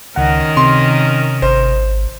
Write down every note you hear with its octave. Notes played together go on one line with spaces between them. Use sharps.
C#2 D#3 C#4 A#4 F#5
C3 C6
G#1 C5